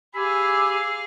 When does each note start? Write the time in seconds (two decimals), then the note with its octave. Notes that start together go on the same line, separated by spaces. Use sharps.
0.15 G4 G#4 F5 G#5 B5 E6